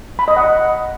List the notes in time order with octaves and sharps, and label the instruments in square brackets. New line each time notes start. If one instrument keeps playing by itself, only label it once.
[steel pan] B5
D#5
F#5